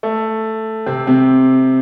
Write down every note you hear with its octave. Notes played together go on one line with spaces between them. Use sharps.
A3
C3 C4
C3 C4